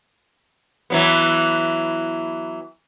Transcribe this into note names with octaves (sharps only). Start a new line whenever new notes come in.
E3 F#3 B3